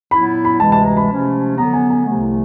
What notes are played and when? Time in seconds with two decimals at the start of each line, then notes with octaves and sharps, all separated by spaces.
0.11 A#2 F#3 B3 E4 B5
0.45 B5
0.60 D2 C3 E3 G#3 A5
0.72 A5
0.85 A#5
0.97 B5
1.09 C3 F3 A3 C#4
1.58 D3 F#3 B3 A#5
1.73 G#5
1.90 G#5
2.06 C2 C3 F3 A3